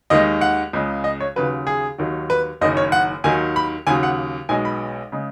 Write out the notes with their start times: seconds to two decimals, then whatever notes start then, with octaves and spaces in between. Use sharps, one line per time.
0.10 D#2 D#3 G#3 D#5
0.41 F#5
0.73 C#2 C#3 G#3
1.04 D#5
1.20 C#5
1.36 D#2 C#3 F#3 B4
1.67 G#4
1.98 D#2 D#3 F#3
2.30 B4
2.61 F#1 F#2 D#3 D#5
2.77 C#5
2.92 F#5
3.24 D#2 D#3 F#3 G#5
3.56 B5
3.87 D#2 C#3 F#3 G#5
4.03 F#5
4.49 B1 B2 G#3 G#5
4.65 B5
5.12 C#3 G#3